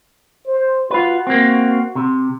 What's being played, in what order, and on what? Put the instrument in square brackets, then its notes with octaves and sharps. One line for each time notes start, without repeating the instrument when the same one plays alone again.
[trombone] C5
[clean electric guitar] F4 B4 [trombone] F#4
[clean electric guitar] A#3 C4
C3